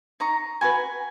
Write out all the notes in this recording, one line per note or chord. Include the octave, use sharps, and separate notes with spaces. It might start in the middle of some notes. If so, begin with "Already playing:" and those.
D#4 A#5 C#6
F#4 B4 G#5 B5